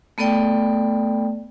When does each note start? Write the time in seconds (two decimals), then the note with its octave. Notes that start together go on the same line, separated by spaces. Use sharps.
0.18 A3 B3 A4 D5 G5